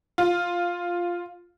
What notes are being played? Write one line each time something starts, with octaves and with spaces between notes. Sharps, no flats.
F4